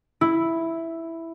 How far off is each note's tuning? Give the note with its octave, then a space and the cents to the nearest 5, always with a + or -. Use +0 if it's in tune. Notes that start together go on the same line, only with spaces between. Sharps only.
E4 +0